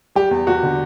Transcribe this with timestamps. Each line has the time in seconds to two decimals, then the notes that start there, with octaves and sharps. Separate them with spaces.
0.16 G3 G4
0.31 E2
0.47 E2 F#4
0.63 D3